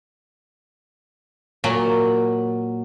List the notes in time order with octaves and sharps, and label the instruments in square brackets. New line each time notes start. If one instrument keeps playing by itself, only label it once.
[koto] A#2 F#3